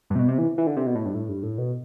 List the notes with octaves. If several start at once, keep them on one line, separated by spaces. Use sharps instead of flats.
G2
C3
B2
C3
E3
E3
D3
C3
B2
A2
G2
A2
G2
A2
B2